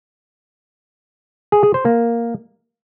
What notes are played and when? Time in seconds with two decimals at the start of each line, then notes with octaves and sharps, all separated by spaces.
1.52 G#4
1.63 G#4
1.74 C5
1.85 A#3